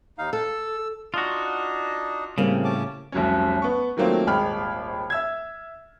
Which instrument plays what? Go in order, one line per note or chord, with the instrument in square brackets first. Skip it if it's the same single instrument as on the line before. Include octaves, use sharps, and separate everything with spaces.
[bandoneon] D#2 D#4 F5
[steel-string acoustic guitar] A4 [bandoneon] E6
[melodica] D4 D#4 [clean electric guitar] F4 F#4
[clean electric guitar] A2 C#3 [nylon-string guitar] G3 A#3 C4
[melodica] C#4 A5 D6
[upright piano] F1 C2 F#3 C#4
B3 C#6
D#3 F#3 A3 A#3 C4 F4
D#1 G#1 G#3 G5 B5 F6
E5 E6 G#6